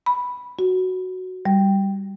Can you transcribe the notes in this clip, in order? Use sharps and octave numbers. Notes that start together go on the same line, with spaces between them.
B5
F#4
G3